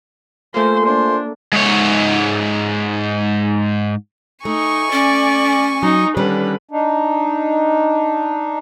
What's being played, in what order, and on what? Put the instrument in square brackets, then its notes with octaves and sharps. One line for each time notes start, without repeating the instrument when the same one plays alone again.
[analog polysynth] A3 A#3 [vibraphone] F4 A4 G#5 [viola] C5 C6
[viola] D4 [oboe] C5
[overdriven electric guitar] G#2 C#5
[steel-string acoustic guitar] A3 [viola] D#4 [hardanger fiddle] G#5 C#6
[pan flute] C#4 [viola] D5
[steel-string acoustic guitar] F#3 [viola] D#4
[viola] D3 B4 [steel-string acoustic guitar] D#3 G3 C#4
[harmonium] D4 D#4